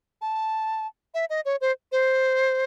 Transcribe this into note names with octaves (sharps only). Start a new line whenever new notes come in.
A5
E5
D#5
C#5
C5
C5